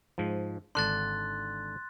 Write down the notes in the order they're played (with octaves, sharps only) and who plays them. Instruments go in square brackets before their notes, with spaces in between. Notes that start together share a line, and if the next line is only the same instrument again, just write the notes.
[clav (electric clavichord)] G#2 F3
[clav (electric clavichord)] G#1 D3 D4 [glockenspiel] C6 F#6 A6